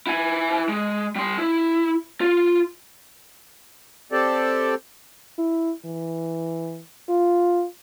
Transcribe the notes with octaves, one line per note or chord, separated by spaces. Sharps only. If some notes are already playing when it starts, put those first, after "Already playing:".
E4 G#5
G#3
G3 C6
E4
F4
C4 G4 A4 D5
E4
E3
F4